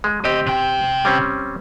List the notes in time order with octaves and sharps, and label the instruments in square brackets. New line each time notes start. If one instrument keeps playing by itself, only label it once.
[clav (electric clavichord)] G#3
[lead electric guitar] D2 D#5 [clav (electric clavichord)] C4 G4
[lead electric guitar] C3 G5
[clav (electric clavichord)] G3 C4 C#4